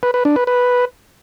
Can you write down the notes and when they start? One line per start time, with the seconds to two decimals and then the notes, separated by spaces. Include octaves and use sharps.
0.03 B4
0.14 B4
0.25 D4
0.36 B4
0.47 B4